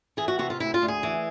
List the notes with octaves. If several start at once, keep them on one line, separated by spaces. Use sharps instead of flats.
E3 G#4
F#4
C3 F#4
F4
D2 E4
F4
D2
G#4
E3